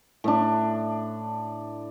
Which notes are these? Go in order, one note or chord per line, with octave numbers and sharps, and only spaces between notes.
A2 D4